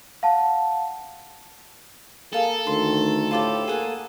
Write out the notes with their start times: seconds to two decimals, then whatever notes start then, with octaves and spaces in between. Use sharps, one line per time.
0.23 F5 F#5 A5
2.33 A#3 G#4 A4 F5 A5
2.67 D2 D#3 C6
3.31 A2 F4 G4 A5
3.67 A#3 G#4 F#5 G#5